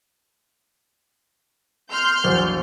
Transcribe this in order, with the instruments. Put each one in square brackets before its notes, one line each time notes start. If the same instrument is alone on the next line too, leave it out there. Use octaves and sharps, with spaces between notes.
[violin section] C6 F6 G6
[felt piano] A#1 E2 F#3